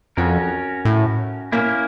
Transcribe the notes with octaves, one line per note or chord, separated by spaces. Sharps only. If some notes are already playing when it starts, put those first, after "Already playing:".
F2 C#4 F#4 A#4
A2
A#2 A#3 C#4 E4